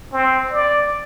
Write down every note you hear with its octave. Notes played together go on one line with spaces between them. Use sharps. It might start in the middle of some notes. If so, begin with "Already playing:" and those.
C4
D5